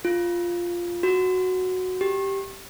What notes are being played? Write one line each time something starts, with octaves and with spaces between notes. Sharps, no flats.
F4
F#4
G4